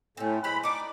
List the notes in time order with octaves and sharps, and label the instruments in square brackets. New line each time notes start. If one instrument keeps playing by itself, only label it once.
[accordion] A2 [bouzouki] C4 C#4
[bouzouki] F#3 G#3 C5 [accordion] B5
[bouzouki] D4 D#4 [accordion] D6